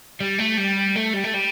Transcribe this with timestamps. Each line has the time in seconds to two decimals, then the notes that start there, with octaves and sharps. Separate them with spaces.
0.20 G3
0.39 A3
0.58 G3
0.96 A3
1.13 G3
1.24 A3
1.34 G3